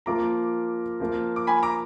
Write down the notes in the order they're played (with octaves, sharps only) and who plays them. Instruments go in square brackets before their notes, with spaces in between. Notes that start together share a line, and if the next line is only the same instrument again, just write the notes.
[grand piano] F3 A#3 F4 A#4 [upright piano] A#5 D6
[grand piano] F3 A#3 F4 A#4
[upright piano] D6
G#5 B5
A#5 D6